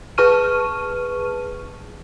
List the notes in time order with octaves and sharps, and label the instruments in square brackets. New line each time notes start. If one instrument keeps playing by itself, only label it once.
[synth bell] G#4 B4 A5 C#6 F6 D#7